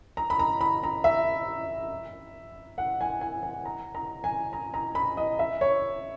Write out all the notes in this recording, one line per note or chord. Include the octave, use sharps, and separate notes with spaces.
A#5
B5
A#5
B5
A#5
E5
F#5
G#5
G#5
G#5
A#5
A#5
G#5
A#5
A#5
B5
D#5
E5
C#5